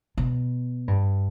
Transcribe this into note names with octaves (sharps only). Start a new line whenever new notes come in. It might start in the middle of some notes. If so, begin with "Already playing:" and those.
B2
G2